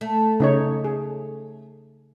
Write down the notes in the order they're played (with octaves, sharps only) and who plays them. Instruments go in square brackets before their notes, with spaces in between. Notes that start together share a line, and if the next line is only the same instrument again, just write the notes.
[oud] A3
[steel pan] C#3 D#4 C#5
G#4